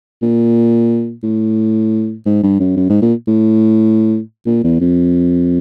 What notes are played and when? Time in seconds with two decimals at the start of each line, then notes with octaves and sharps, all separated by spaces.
0.22 A#2
1.23 A2
2.26 G#2
2.43 G2
2.60 F#2
2.77 F#2
2.89 G#2
3.02 A#2
3.27 A2
4.46 A#2
4.63 E2
4.81 F2